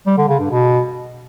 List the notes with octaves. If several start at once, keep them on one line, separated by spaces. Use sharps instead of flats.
G3
D3
C#3
G2
B2